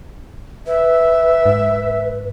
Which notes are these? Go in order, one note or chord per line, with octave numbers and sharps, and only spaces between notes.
B4 E5
G#2